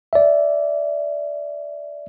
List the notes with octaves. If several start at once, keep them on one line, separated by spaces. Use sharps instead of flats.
D5 E5